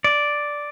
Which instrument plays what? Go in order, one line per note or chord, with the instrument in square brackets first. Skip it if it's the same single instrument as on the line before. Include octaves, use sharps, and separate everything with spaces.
[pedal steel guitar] D5